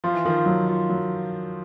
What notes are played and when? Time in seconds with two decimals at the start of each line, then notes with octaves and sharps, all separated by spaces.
0.04 F3 F4
0.14 E3
0.24 D#3 F3 F4
0.46 F#3
0.68 F4
0.90 F#3